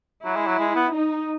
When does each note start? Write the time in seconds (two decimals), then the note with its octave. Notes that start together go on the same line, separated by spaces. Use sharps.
0.25 F#3 E4
0.36 G#3
0.47 F#3
0.59 G#3
0.76 B3
0.93 D#4